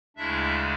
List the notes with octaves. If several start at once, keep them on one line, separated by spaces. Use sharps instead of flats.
D2 C#3 G#3 D4 E4 E5